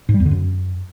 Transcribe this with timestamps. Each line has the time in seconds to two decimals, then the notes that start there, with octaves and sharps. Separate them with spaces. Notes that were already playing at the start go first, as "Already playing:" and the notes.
0.09 G#2
0.14 G3
0.20 E2
0.25 D3
0.31 F#2